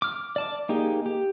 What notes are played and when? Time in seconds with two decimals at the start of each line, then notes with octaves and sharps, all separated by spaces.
0.02 D6 F6
0.36 D5 A5 D6
0.69 A#3 D#4 G4 G#4
1.06 G4